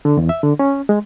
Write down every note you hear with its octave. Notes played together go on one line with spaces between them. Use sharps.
D3
E2
E5
D3
C#4
G#3